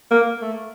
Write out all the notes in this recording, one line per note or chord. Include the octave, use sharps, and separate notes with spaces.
A#3
A3